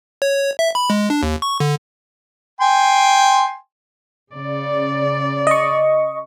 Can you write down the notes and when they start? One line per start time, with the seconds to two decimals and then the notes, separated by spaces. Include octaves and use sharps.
0.22 C#5
0.59 E5
0.75 B5
0.90 G#3
1.10 D4
1.23 D#2
1.42 C#6
1.60 D3
2.61 G5 G#5 C6
4.33 C#3 D5
5.47 D#5 C#6